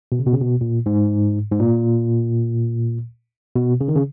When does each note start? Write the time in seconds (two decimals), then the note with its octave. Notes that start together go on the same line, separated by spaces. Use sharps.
0.12 B2
0.19 C#3
0.26 B2
0.33 C#3
0.41 B2
0.61 A#2
0.86 G#2
1.52 G#2
1.60 A#2
3.56 B2
3.81 C#3
3.88 D#3
3.96 C#3